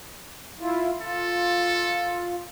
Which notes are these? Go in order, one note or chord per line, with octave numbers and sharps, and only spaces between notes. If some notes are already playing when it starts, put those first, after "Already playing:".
E4 F4
F4 A4